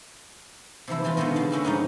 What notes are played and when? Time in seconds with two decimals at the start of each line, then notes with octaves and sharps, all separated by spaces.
0.88 C3 E3 F3 E4
1.04 C3 E3 G3 F4
1.17 B2 D3 D#3 G#3 B3
1.36 C#3 G3 G#3
1.51 D3 C#4 E4 G4
1.65 G#2 C#3 F3 C#4 D#4